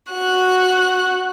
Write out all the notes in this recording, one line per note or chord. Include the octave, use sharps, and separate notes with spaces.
F#4 F#6